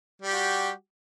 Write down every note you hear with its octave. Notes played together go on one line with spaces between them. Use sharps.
G3 F#4 G4